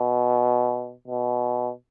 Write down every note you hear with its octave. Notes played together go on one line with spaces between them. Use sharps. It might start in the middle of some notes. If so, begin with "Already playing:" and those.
Already playing: B2
B2